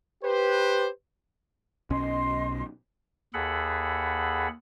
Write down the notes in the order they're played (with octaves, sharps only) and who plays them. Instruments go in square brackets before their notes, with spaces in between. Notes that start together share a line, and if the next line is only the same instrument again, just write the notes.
[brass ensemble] G4 B4 C5
[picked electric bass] B1 B2 C#4 [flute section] D#5 C6
[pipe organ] D#2 G#4 A4 F#5 B5